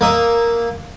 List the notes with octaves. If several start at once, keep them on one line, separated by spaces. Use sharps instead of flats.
A#3 E5 D#6